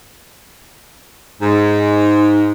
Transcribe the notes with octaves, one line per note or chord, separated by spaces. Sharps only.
G#2